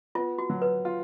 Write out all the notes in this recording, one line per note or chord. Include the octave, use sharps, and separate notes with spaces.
B3 F4
F#4
F#3
B4
F4